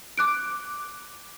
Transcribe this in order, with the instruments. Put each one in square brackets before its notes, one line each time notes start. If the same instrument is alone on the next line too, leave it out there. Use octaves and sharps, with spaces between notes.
[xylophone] D6 F#6 D7